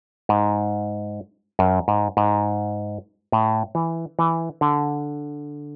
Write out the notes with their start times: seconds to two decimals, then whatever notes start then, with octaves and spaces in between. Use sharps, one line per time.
0.29 G#2
1.59 F#2
1.88 G#2
2.17 G#2
3.32 A2
3.75 E3
4.19 E3
4.61 D3